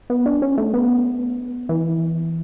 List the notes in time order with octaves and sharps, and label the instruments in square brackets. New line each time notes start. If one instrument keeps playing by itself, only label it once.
[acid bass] B3
D4
C#4
A3
B3
E3